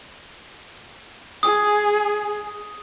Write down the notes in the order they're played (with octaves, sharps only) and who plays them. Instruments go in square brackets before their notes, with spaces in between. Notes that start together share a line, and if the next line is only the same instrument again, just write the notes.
[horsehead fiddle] G#4 [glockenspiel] D#6